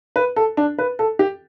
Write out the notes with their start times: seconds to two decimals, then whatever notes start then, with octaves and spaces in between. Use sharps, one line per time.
0.16 B4
0.36 A4
0.57 D4
0.78 B4
0.99 A4
1.19 G4